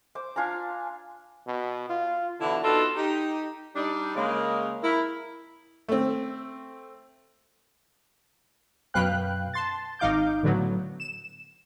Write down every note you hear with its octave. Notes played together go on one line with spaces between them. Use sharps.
C5 D6
D4 F4 G#5 A#5
B2
F4
B2 D3 E3 D4 E4
B3 D4 D#4 F4 F#4 A4
D#4 G4
G3 D4 D#4
C#3 G#3 A#3
E4 A#4
A3 C4
F#2 B2 B4 F5 G5 F#6
A5 C6 A6
G#1 D#4 F5 D6 G6
A2 D3 F#3 B3
E7